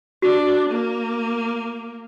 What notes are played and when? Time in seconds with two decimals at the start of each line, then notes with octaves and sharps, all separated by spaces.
0.22 D4 F#4
0.70 A#3